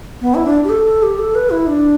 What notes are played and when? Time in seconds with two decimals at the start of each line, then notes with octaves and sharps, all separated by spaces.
0.21 B3
0.35 E4
0.45 D4
0.64 G4
0.70 A4
0.86 A4
1.03 G4
1.19 A4
1.35 B4
1.50 E4
1.67 D4